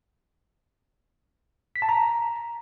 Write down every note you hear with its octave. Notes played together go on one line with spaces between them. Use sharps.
B6
A5
A#5